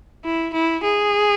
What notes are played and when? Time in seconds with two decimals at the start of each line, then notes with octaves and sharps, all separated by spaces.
0.25 E4
0.54 E4
0.83 G#4